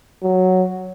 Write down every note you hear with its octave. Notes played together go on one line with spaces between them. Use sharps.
F#3